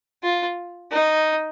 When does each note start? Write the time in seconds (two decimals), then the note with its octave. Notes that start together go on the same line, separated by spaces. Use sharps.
0.23 F4
0.92 D#4